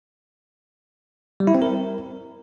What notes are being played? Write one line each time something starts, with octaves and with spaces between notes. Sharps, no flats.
G3
E4
C4
A#4